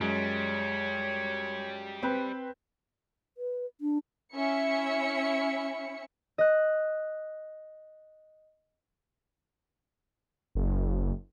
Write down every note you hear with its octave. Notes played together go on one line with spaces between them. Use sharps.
F#2 G3 G#3 C#5
C4 B4
B4
D4
C#4 E4 E5 C#7
D#5 F#6
F#1